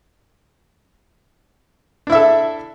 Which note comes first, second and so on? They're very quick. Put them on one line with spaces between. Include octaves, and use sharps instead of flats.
D4 E4 E5 A4